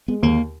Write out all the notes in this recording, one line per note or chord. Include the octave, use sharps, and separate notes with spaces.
G#3 B3
D#2 A#3